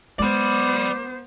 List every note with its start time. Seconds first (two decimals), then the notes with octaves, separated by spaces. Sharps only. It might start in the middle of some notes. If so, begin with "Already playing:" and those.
0.19 G#3 B3 C5 D5 B5 D6